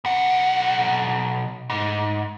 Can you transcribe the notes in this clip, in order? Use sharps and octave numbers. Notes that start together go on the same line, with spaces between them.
B1 F#5
G#2